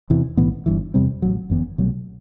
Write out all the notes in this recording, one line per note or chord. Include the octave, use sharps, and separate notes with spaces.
E2 C3 E3
B1 A2 E3 B3
G1 G2 E3
E2 C3 G3 C4
A1 A2 F#3
G1 F#2 E3 B3
C2 B2 F#3 A3